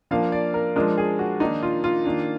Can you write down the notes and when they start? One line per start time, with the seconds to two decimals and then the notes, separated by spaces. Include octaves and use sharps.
0.11 F3 A#3 D4 F5
0.32 D5
0.54 A#4
0.76 F3 G#3 D4 A#4
0.98 G#4
1.19 F#4
1.40 D#3 A#3 D4 D#4
1.63 F4
1.84 F4
2.05 D#3 A#3 D4